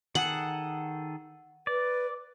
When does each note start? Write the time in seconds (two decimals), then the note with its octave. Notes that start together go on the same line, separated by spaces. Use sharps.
0.15 D#3 G#4 A4 F#5
1.67 B4 D5